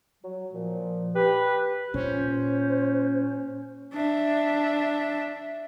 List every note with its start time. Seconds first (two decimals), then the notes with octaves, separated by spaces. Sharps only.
0.23 F#3
0.53 A#2 F3
1.15 G4 B4
1.94 A#2 C#4 C5
3.93 D4 E5